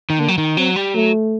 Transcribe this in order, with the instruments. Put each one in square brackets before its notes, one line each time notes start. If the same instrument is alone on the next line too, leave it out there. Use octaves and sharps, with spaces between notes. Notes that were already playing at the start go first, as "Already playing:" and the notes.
[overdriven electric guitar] D#3
[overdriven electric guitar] D3 [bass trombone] A#3
[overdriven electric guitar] F#3
D#3
[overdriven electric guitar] F#3 [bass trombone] C4
[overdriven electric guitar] G3
[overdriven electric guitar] F#3 [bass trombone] A3